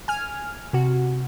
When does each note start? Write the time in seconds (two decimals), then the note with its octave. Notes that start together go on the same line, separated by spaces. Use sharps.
0.08 G#5 F6
0.73 C3 F#4